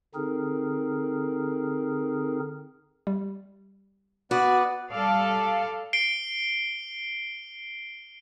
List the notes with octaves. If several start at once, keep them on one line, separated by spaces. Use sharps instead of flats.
D3 C4 D#4 G#4 A#4
G3
B3 F#4 B4 D5
G3 A4 D5 F5
C7 D7 G7